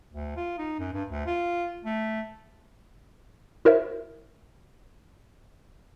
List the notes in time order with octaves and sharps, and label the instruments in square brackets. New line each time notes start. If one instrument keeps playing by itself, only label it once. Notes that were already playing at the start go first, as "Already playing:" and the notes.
[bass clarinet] D2
F4
D#4
F#2
G2
D2
F4
A3
[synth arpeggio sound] E4 F#4 A#4 C5 C#5 E5